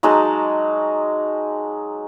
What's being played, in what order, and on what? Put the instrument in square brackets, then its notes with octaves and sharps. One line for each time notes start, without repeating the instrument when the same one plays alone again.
[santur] F#3 G#3 D#4 A5